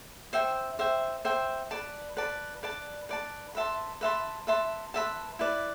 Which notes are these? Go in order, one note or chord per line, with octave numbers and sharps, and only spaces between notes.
C5 E5 G5
C5 E5 G5
C5 E5 G5
B4 D5 A5
B4 D5 A5
B4 D5 A5
B4 D5 A5
B4 E5 A5 C6
B4 E5 A5 C6
B4 E5 A5 C6
B4 E5 A5 C6
E4 B4 D5